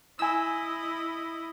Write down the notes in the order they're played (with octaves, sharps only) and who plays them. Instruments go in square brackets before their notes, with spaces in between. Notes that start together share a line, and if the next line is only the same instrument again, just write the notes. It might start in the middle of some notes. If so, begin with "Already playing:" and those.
[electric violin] E4 D#5 [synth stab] G#5 E6